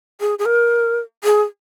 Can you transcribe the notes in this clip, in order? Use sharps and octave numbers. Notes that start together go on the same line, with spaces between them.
G#4
G#4
A#4
G#4